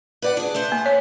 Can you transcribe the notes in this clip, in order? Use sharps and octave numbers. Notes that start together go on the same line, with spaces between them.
B4 D5 F#5
D4 G#4
A3 C5 F#5
A#3
C#5